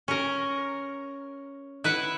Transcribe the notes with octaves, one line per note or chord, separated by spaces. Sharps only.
C#4 A#4
E4 B4 E5 F#5